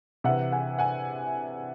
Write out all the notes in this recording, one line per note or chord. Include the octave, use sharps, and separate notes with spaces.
C3 E3 E5 F#5
F#5 G#5
F#5 G#5